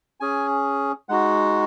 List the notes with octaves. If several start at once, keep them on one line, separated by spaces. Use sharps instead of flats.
C#4 G#4 G#5
G#3 D#4 F#4 F#5